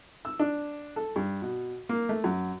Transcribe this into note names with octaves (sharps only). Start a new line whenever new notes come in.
E6
D4
A4
G2
B2
A#3
A3
F#2